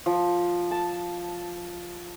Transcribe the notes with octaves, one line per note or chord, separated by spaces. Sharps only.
F3
A5